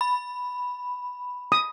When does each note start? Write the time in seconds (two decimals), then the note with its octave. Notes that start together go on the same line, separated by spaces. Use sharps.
0.01 B5
1.52 D#6